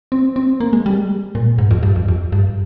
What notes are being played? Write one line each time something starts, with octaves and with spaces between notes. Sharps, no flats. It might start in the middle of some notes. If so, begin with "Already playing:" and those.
C4
C4
A#3
G#3
G3
G#3
A#2
G#2
F2
G2
F2
F2
G2